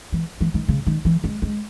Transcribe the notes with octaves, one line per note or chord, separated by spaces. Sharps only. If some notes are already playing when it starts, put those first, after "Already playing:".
E3
E3
D#3
C#3
D#3
E3
G#3
G#3